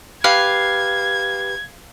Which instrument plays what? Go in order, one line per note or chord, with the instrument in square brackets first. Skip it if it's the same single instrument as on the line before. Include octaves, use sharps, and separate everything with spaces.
[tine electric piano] G4 B4 [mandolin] F5 [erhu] G#6